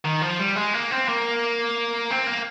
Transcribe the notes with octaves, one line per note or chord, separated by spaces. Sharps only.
D#3
F3
G3
G#3
A#3
C4
A#3
C4
A#3